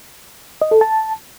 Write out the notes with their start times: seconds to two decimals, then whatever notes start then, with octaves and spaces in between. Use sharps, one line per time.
0.62 D#5
0.71 A4
0.81 A5